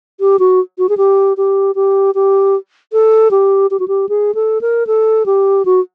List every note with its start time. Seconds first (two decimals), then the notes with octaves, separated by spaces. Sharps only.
0.20 G4
0.39 F#4
0.78 F#4
0.89 G#4
0.97 G4
1.37 G4
1.75 G4
2.15 G4
2.93 A4
3.31 G4
3.71 G4
3.80 F#4
3.88 G4
4.09 G#4
4.35 A4
4.61 A#4
4.87 A4
5.26 G4
5.65 F#4